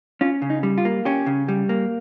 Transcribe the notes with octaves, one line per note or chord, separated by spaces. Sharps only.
C#4 F4
C#3
D#4
G3
F4
A#3
C#4 G4
C#3
G3
A#3